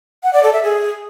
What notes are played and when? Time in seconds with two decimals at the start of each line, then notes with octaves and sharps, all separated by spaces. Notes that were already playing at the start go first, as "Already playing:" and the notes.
0.23 F#5
0.33 D5
0.43 A4
0.53 E5
0.63 G#4